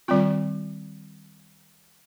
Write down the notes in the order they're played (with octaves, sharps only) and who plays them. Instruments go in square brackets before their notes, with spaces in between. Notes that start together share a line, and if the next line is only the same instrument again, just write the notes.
[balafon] D#3 G3 C4 F4